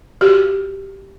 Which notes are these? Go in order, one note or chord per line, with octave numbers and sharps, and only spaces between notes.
F#4 G4